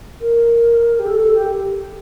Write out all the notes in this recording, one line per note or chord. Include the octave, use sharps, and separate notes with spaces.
A#4
G4
A4
A4
G4